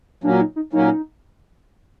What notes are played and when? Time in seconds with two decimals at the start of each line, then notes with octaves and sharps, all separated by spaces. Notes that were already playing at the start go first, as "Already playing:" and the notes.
0.24 A#2 F#3 A#3 C#4 D4
0.40 D#4
0.56 D#4
0.73 A#2 F#3 A#3 C#4 D#4